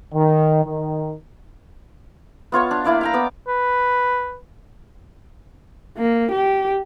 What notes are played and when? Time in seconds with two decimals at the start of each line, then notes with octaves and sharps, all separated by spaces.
0.13 D#3
0.65 D#3
2.52 B3 F4 C#5 C#6
2.71 D4
2.84 A#3 E4 D5 F5
3.01 F5 G5 A#5
3.13 B3 D6
3.48 B4
5.97 A#3
6.32 G4